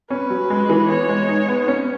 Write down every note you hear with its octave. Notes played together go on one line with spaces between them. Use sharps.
C#4 B4
F#3
G#3
E3
B3 C#5
G#3
D#4
B3
C#4